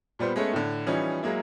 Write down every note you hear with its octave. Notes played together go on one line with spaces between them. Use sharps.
A#2 G3 B3 C5
G#3 A3 B3 C#4
A2 D3
E3 F3 G3 C#4 D#4
F#3 G#3 A#3 E4